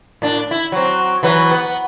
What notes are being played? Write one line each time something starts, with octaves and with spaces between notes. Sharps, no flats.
A2 D4
E4
F#3 C4
E3 F#3 B4
B3